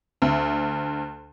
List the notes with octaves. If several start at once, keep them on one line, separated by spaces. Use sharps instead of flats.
D2